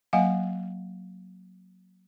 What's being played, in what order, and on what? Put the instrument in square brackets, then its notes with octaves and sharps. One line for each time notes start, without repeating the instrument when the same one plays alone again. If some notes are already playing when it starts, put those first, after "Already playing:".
[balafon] F#3 A#3 D#5 F5 F#5 G#5